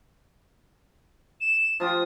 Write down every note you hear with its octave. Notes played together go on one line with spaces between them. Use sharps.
E7
F3 F4 G4 D#6